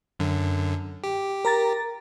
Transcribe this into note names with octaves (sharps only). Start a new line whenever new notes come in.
F#2 D3
G4
A#4 A#5 A6